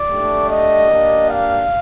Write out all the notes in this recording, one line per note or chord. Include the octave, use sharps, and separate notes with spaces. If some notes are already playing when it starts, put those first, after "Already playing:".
Already playing: D5
A3 D4 G4
D#5
A#3 D4 G4
F5